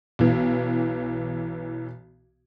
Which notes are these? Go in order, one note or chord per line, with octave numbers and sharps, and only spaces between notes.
B1 E3